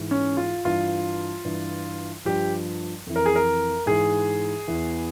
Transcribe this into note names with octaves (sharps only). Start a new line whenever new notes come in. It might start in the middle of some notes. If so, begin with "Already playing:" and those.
Already playing: G#2 E3
C#4
F4
G2 E3 F4
G2 E3
G2 F3 G4
F2 E3
A#4
G#4
A#4
G#2 E3 G#4
E2 E3